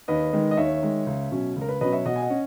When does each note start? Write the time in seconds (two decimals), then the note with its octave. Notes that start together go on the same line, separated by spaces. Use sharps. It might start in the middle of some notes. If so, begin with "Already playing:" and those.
0.08 D#2 B4 D#5
0.33 D#3 G#3
0.51 D#5
0.57 D#2 C#5 E5
0.82 D#3 G#3
1.07 C#2
1.31 B2 F#3 C#4
1.56 C#2
1.61 A#4
1.69 B4
1.81 B2 F#3 C#4 B4 D#5
1.93 C#5 E5
2.05 B2 D#5 F#5
2.16 G#5
2.22 D#5 F#5
2.30 C#4